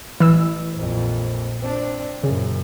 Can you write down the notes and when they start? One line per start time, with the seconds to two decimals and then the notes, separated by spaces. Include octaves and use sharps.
0.20 A1 E3 E6
0.77 A#1 F2
1.61 C4 D4
2.24 F#2 A#2 C#3